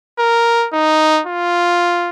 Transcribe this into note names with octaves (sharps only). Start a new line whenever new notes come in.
A#4
D#4
F4